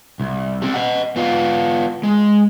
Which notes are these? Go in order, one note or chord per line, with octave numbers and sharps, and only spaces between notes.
C2
G3 C4
D#5 F#5
B3 F4
G#3